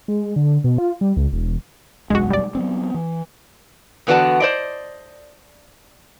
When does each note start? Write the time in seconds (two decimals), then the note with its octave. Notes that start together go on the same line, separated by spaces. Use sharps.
0.08 G#3
0.36 D3
0.64 B2
0.78 F4
1.01 G3
1.17 C#2
1.33 E1
2.10 E1 B1 F#2 G#3 F#4
2.30 G3 D5
2.55 F#3 B3 C4
2.94 E3
4.07 E2 D3 B3 F#4 D5 A5
4.40 C5 D5 D#5